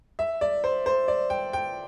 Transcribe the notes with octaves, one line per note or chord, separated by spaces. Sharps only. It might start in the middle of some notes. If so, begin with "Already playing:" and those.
E5
D5
C5
C5
D5
G5
G5